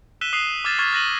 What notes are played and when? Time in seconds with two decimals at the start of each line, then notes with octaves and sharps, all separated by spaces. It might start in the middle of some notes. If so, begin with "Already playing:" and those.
0.21 E6 F#6 B6 D#7 E7 G7
0.33 D#6 F#6 C7 D#7 F7
0.64 D6 E6 F6 G#6 A6 E7
0.79 C#6 F6 G#6 A6 B6 C7
0.93 F6 F#6 A#6 D#7 F#7 G7